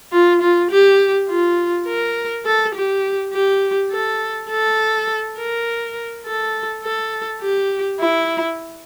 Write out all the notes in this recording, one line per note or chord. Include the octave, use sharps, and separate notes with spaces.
F4
F4
G4
F4
A#4
A4
G4
G4
A4
A4
A#4
A4
A4
G4
E4